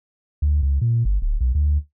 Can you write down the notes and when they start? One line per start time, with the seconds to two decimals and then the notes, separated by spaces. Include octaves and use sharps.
0.42 D2
0.63 C#2
0.81 A#2
1.05 G1
1.22 D1
1.41 B1
1.55 D2